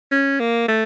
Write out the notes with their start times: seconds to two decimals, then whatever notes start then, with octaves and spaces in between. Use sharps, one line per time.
0.11 C#4
0.40 A#3
0.68 A3